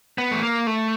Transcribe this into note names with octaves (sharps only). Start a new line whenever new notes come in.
B3
A3
A#3
A3